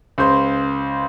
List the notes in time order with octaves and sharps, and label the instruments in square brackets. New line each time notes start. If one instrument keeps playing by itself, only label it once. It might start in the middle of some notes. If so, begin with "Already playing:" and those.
[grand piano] C#2 C5 C6